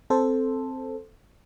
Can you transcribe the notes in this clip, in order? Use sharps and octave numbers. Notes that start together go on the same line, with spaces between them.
C4 A4 C5